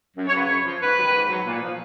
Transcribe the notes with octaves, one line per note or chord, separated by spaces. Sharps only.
F#2
C#5
C#3 F#3 B4
F#2 C#5
F3
G#2 B4
D#3 F#3
G#2
F#3
A#2
F3